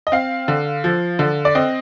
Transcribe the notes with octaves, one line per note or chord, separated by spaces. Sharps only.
D#5
C4 F5
D3
F3
D3
D5
C4 D#5